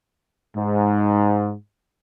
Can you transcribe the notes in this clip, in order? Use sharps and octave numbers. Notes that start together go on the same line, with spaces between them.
G#2